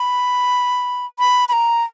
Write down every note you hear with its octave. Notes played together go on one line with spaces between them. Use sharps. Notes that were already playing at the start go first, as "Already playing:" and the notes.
Already playing: B5
B5
B5
A#5